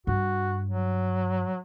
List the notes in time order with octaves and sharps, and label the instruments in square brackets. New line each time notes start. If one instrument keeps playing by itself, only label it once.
[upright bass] G2 [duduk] F#4
[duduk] F#3